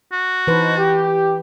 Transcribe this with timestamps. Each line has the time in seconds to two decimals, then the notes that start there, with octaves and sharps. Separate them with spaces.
0.12 F#4
0.47 E3 D#4 B4 C5 A5
0.77 G4